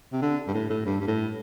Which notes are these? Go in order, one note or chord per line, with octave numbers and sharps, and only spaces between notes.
C3
D3
G2
A2
A2
G2
G2
A2